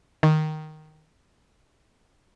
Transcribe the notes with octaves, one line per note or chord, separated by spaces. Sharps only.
D#3